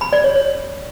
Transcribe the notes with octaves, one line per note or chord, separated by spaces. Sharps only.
B5
D5
C#5
C#5